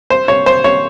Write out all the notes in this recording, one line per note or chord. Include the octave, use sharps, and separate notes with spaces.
C5
C#5
C5
C#5